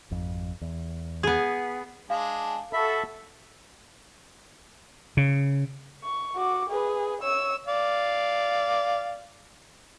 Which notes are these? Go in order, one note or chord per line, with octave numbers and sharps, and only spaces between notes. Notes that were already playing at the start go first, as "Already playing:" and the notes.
G#1 F2
E2
B3 G#4
G#3 D4 F5
F#4 A4 E5 B5
C#3
C#6
F#4 D6
G#4 B4
C#5 E6
D5 F5